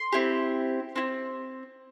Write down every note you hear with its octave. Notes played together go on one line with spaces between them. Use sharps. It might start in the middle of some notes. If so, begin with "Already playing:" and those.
Already playing: C6
C4 E4 G4
C4 E4